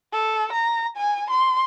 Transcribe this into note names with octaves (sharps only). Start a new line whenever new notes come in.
A4
A#5
G#5
C6